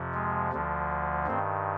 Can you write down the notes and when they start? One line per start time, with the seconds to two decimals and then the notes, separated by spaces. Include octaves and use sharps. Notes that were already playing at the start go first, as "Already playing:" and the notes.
Already playing: F2 C3 F3
0.14 G#3
0.53 D2 D3 F3
1.27 G2 D#3 C4